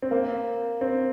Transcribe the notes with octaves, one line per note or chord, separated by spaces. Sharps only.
C4
A#3
C4